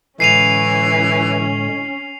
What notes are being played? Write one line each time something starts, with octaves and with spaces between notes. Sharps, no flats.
A2 D3 E3 G#3 C#4 C7 D#7 F7